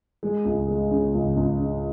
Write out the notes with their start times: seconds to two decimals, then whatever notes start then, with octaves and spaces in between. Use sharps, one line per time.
0.23 G#3
0.45 C#2
0.68 G#3
0.91 C#3
1.14 C#2
1.36 C#2
1.60 C#3